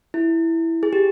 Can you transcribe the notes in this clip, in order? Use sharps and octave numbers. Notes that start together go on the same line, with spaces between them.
E4
G#4
G4